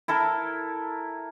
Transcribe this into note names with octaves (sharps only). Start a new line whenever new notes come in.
E4 A4 A#4